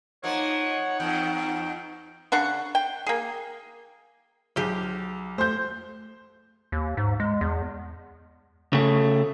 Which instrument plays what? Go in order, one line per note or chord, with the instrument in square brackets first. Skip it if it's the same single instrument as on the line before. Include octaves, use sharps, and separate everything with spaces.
[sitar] F3 A#3 [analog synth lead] D#4 [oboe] C#5 [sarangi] F#5
[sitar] E2 [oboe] G5
[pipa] C#3 D4 F#5 C#6
G5
A#3 G#4
[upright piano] B1 [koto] F3 G4 G#4
[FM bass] A3 [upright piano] C5 G6
[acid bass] D#2
G#2
G#3
E2
[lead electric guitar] C#3 A3